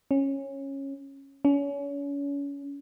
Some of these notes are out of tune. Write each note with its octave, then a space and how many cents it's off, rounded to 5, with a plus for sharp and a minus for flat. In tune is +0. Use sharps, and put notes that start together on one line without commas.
C#4 -15
C#4 +35